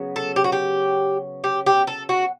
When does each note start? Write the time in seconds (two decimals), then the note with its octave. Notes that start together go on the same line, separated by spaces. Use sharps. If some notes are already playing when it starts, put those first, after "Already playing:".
Already playing: C#3 F#3 B3
0.16 A4
0.36 G4
0.44 F#4
0.52 G4
1.44 G4
1.66 G4
1.87 A4
2.09 F#4